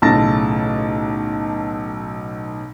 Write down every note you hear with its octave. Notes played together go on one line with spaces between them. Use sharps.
B1 A2 C#3 A5 A6 A#6